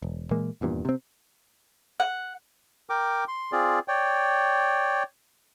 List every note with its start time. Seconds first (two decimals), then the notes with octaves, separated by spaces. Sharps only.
0.02 E1
0.31 A#2 E3 G#3 A#3
0.61 D#1 E2 G2 A#2
0.85 C3 C4
2.00 F#5
2.90 A#4 G5 D6
3.28 C6
3.52 C4 F4 G#4 D5
3.88 C#5 D5 G5